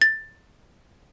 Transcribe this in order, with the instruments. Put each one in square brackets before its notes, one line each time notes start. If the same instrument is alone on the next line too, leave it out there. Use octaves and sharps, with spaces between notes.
[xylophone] A6